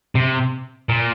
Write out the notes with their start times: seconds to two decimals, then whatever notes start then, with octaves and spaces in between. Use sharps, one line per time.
0.15 C3
0.89 A#2